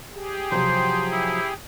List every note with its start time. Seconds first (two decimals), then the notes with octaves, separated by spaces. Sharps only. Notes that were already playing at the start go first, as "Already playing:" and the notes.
0.13 G4 G#4
0.52 C3 F3 F#3 C5
1.12 E4